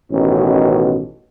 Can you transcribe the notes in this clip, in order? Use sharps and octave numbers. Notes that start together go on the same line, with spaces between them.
A1 B2 D#3 C#4